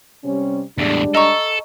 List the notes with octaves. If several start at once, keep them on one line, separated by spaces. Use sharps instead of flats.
C3 G3 C#4
E2 A2 G3 G#3 D4
A4 D#5 A#5 C#6